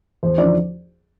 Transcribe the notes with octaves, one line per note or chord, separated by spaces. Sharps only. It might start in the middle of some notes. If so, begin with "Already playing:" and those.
E2 C5
D3 F3 D5